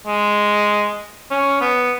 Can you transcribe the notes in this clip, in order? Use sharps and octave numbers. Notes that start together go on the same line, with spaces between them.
G#3
C#4
B3